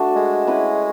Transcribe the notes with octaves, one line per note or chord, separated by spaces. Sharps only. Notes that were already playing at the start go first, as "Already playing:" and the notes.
Already playing: A3 D4 F#4
G#3
C#4 E4 B4